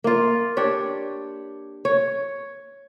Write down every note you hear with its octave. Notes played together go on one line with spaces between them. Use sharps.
A#3 F4
D4 G4 C#5
C#5